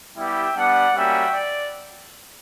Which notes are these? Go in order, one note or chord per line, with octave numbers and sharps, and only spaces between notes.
G3 B3 E4 G4 E5 G5
G3 B3 D4 D5 F#5
G3 A#3 C#4 F#4 E5 G5
D5